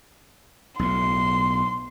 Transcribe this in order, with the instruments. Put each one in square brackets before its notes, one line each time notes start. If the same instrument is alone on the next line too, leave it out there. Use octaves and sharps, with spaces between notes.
[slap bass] B1 A2 [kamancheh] C6